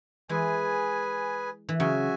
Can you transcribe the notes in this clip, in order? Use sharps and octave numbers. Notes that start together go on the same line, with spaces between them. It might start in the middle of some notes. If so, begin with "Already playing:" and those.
E3 G#3 G#4 B4 G#5
E3
C#3 F#3 F#4 E5 G#5